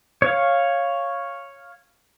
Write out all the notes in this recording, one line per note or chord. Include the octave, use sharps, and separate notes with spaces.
C#5 F5